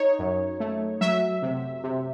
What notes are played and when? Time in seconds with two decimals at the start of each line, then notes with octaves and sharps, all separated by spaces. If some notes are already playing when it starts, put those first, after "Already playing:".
Already playing: D#4 C#5
0.19 F#2
0.60 A3
1.01 F#3 E5
1.42 C3
1.84 C3